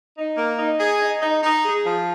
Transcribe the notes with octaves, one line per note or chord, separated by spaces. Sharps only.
D#4
A#3
D#4
G#4
D#4
D#4
D#4
G#4
F3